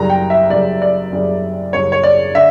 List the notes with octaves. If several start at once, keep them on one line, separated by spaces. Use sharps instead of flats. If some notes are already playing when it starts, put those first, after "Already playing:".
Already playing: F#1 F#2 C#3 G3 A#5
G5
E5
F#1 F#2 C#3 G3 D5
D5
F#1 F#2 C#3 G3
F#1 F#2 C#3 G3 C#5
C#5
D5
D3 E5